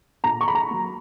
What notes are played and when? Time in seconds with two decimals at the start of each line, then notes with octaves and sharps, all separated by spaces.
0.24 A#2 A#5
0.41 C#6
0.48 B5
0.55 A#5
0.71 F#3 A#3